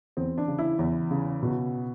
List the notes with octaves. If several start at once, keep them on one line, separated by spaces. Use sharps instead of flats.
E2 C4
D4
C#3
E4
E2
C#3
B2